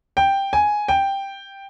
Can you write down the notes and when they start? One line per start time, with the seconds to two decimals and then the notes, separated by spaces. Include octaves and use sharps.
0.17 G5
0.53 G#5
0.88 G5